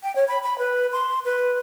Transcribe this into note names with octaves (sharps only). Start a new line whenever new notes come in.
G5
C#5
B5
B5
B4
C6
B4